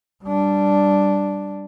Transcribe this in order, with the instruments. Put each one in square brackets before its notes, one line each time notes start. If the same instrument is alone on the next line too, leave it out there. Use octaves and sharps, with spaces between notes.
[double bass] G3 D4